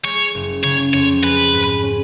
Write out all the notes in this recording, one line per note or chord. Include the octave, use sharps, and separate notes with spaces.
G#3 C#5
F#1
C#3 C#5
F2 C#5
G#4 B4
G#2
C#4